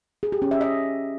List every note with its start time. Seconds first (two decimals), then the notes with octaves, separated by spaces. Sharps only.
0.23 G#4
0.32 G4
0.42 C#4
0.51 E5
0.61 D#5